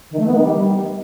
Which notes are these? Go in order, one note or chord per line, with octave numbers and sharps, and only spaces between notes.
D#3
A3
B3
D#3
G3